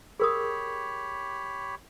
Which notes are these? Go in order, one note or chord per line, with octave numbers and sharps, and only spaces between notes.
G4 G#4 A#4 C#5 B5 D#6